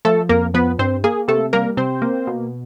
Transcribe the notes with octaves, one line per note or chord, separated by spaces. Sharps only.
F3 A3 A4
F2 A#3 A#4
F3 B3 B4
G2 C4 C5
A#3 G#4
C3 A3 A4
G3 A#3 A#4
C3 C4 C5
A#3
B2